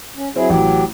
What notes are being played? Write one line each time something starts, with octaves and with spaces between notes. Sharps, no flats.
C#4
F#3 C4 E4 G#4
A1 F#3 G4